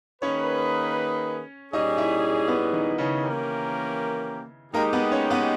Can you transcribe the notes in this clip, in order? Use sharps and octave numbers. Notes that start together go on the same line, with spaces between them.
D#3 A#3 C#4 D#4 G#4 B4 C#5
A#2 G3 C#4 D#4 G#4 D#5
E4 E5
B3 B4
D#3 D#4
C#3 C#4
E3 A#3 C#4 G4 A#4
G#3 A#3 D#4 G4 A#4
B3 B4
C#4 C#5
B3 B4